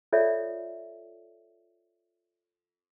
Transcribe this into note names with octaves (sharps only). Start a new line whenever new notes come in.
F4 A4 C#5 D5 E5